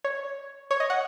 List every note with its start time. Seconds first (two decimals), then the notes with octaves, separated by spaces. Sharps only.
0.04 C#5
0.71 C#5
0.80 D#5
0.90 F#5